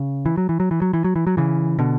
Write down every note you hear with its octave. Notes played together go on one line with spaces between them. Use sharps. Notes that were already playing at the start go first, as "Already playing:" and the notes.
Already playing: C#3
E3
F#3
E3
F#3
E3
F#3
E3
F#3
E3
F#3
C#3 E3
B2 D3